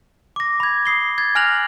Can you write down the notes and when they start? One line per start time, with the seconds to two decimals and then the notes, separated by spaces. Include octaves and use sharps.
0.36 D6 A#6
0.60 B5 G#6
0.86 D#6 C7 G7
1.18 G#6 A6
1.35 G#5 F6 F#6 A#6 F7 F#7